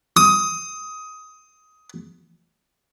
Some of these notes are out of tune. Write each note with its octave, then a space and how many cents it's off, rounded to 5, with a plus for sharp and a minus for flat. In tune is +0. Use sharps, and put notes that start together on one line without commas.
D#6 +15